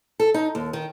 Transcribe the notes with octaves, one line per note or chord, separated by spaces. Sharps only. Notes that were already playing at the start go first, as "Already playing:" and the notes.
A4
D#4
D#2
D#3